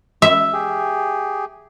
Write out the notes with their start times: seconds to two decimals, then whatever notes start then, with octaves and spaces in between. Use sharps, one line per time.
0.22 E5
0.53 G4 G#4